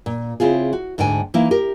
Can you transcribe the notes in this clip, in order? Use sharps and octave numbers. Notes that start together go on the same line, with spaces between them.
A#2
C#3 C4 E4 F4 G#4
F#4
D2 G#2 D3 G5 G#5
E3 A#3 D#4 E4
G4 A#4